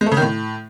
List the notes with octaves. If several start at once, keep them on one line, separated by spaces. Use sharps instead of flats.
G#3
A3
C#3
D#3
A2